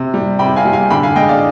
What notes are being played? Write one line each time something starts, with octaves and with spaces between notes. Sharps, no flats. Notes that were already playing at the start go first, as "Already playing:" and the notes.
Already playing: C3
G3
C3 G5 B5
F5 G#5
G3
F5 G#5
D3 G5 B5
F5 G#5
G#3 D#5 G5
D5 F5